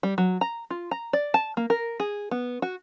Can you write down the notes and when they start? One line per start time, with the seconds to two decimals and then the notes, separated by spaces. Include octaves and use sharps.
0.03 G3
0.18 F#3
0.41 A#5
0.70 F4
0.91 A#5
1.13 D5
1.34 A5
1.57 A#3
1.70 A#4
2.00 G#4
2.31 B3
2.62 F#4